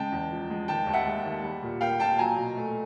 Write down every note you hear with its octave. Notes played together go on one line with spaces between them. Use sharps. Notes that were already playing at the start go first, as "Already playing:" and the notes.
Already playing: C#3 G#3 G5 A5
E2
F3
G#3
D#3 G5 A5
D#2
E5 F#5
G#3
D#2
G3
A#2
A#3 F5 G5
A#2 G5 A5
F#3 G#5 A#5
B2
A3